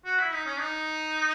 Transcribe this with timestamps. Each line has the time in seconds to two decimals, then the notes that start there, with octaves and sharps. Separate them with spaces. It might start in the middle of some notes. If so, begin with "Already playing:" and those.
0.05 F#4
0.19 E4
0.32 D#4
0.46 C#4
0.59 D#4